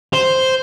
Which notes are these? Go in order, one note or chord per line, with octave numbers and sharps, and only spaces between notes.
C5